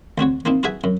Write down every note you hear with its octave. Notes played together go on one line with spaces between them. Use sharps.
D2 C4 F#4 C#5
A#3 C4 D#4 E4
E4 F#4 G#4 B4 E5 G#5
F#2